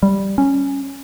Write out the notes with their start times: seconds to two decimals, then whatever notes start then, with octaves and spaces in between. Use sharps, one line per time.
0.03 G3
0.38 C#4